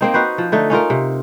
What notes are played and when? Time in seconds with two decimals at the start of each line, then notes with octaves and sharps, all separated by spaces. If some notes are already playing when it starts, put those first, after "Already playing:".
0.01 A#3 C4 D#4
0.14 D#4 F#4 B4 C5
0.38 F3
0.52 D3 A3 D#4
0.70 C#4 D#4 F4 A#4
0.90 C3